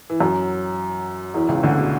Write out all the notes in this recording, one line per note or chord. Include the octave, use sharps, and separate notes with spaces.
E3
F#2 F#3
E2 E3
C#2 C#3
D2 D3
B2